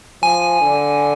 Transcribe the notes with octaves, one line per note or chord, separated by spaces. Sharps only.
F3 G#5
D3